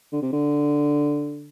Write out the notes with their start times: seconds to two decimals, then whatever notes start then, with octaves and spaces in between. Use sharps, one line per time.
0.13 D3
0.22 C3
0.33 D3